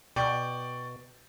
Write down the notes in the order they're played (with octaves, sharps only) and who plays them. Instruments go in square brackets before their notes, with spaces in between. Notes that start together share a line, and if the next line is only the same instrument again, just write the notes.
[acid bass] B2 [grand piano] D5 G5 C#6